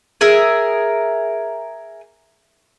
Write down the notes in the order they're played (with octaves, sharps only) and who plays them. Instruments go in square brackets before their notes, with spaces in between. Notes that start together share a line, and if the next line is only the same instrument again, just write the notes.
[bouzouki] G#4 A#4 E5